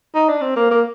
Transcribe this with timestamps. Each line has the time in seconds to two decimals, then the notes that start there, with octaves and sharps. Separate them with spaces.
0.15 D#4
0.29 D4
0.42 C4
0.56 A#3
0.71 A#3